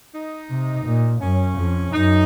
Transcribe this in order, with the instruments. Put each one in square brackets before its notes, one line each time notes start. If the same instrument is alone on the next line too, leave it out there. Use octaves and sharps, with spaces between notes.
[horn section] D#4
[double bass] C3
A#2
[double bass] F#2 [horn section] C#4
[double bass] F2
[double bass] F#2 [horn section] D#4